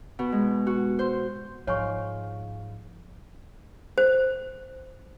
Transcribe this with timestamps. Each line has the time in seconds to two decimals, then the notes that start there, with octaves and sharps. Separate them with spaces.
0.19 B2
0.32 G#3
0.67 F#4
0.99 C5
1.67 G#2 F3 C#5 F5 G#5 C#6 F6
3.98 C5